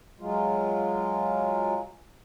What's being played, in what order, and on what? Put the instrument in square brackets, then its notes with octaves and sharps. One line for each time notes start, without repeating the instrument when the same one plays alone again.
[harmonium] F#3 G#3 F4